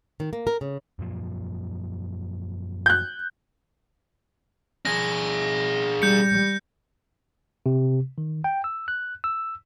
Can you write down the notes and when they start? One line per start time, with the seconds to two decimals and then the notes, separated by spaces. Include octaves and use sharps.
0.20 D#3
0.33 A#3
0.47 A#4
0.61 C#3
0.99 F#2 A#2 F3
2.86 F#6 G6
4.85 D4 G#4 A#6
6.02 G3 G6 C#7
7.66 C3
8.18 D#3
8.44 G5
8.64 E6
8.88 F#6
9.24 E6